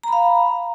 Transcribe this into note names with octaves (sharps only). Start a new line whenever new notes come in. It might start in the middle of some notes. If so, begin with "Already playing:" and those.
F5 A#5 B5